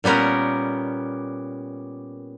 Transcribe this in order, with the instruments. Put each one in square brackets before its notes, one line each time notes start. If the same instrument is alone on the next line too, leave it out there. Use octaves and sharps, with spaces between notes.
[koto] A#2 G3 B3 C#4 A#4